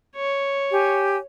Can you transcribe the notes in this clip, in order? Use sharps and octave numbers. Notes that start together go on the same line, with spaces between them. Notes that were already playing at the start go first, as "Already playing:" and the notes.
C#5
G4 G#5